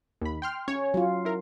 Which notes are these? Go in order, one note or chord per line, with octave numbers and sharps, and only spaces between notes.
D#2 B5
G5 C6 F6
C#4 C#5
F#3 F4
E4 A#4